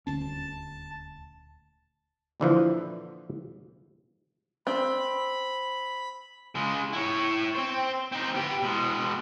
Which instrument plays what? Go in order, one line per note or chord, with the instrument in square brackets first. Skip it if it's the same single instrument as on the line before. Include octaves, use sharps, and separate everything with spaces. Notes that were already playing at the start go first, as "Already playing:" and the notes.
[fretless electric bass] D#1 D2 C#4 [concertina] A5
[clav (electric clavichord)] A#2 D3 E3 F3
[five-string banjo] C4 [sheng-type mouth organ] B5
[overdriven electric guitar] C#3 G#3
E4 C#5
C4 C5
C4 D#4
B3 G4
B2 G#3